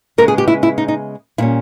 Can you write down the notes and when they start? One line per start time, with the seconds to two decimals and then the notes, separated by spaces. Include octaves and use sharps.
0.18 C#3 G#3 B3 A#4
0.28 G#4
0.38 G4
0.48 E4
0.63 E4
0.78 D#4
0.88 D#4
1.38 A#2 G3 C#4 E4